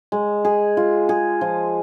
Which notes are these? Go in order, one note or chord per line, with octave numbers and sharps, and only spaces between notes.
G#3
G#4
F4
G#4
F3